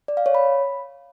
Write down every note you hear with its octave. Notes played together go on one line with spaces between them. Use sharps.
D5
F5
C#5
B5